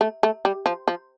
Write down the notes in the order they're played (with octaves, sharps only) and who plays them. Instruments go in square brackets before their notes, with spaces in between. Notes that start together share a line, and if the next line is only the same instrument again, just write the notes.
[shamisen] A3
A3
G3
F3
F3